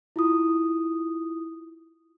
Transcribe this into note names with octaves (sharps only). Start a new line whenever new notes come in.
E4 F4 D#6